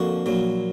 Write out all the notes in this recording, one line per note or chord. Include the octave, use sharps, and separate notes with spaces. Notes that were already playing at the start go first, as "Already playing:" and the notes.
Already playing: F2 D3 F3 A#3 F#4
A#1 A#2 F#3